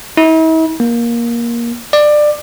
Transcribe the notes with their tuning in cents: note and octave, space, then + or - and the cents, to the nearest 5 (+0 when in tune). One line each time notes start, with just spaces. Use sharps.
E4 -45
A#3 +15
D5 +20